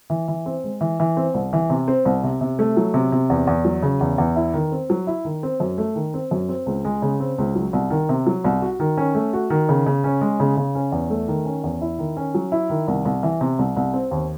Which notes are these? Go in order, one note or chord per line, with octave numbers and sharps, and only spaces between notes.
E3
E3
C4
G#3
E3
E3
C4
C2
E3
C3
C4
C2
C3
C3
A3
F#3
C3
C3
E2
E2
F#3
C#3
E2
E2
E4
D#3
C4
F#3
E4
D#3
C4
F#2
A3
D#3
C4
F#2
C4
C#2
G#3
C#3
C4
C#2
F#3
C2
D#3
C3
F#3
C2
F#4
D#3
C#4
A3
F#4
D#3
C#3
C#3
C#4
G#3
C#3
C#3
C#4
E2
A3
D#3
C#4
E2
E4
D#3
C#4
F#3
E4
D#3
C2
C2
E3
C3
C2
C2
C4
D#2